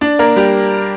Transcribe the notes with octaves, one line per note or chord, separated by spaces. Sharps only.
D4 D5
A#3 A#4
G3 G4